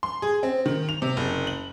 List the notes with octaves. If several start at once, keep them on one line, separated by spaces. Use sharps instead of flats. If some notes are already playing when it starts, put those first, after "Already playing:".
C6
G#4
C4
D#3
F7
C3
F#1
F#7